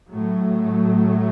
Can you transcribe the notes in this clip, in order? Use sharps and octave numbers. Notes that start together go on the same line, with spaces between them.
A2 F#3 A3